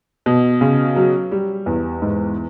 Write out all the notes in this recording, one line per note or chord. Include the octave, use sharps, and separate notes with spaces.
B2
C#3
F#3
G3
E2
G#2